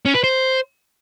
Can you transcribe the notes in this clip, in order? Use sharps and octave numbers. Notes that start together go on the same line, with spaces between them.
C#4
B4
C5